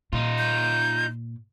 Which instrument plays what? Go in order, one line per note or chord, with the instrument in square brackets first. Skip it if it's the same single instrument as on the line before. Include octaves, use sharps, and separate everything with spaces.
[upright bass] A#2 [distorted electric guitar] D#4 F4
[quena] G6